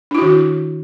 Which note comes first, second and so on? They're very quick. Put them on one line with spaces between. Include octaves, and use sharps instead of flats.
D4 E4 F#4 D#3